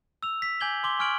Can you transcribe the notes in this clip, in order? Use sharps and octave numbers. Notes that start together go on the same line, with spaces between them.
E6 F7
B6
G#5 D6 G6 G#6 F#7 G7
C6 D6 G7
G#5 C#6 F6 G#6 D7 F#7